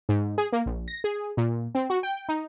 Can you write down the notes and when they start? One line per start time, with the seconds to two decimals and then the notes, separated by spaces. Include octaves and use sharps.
0.09 G#2
0.38 G#4
0.53 A#3
0.66 A#1
0.88 A#6
1.04 G#4
1.37 A#2
1.75 C4
1.90 F#4
2.03 G5
2.29 D#4